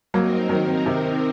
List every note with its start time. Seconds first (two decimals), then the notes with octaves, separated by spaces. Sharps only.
0.14 F#3 A#3 C4 D#4 A#4
0.49 D#3 F#3
0.86 C3 D#3